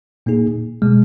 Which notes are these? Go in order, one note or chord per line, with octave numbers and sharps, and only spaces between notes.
A#2 A#3 D#4 G#4
B2 G#3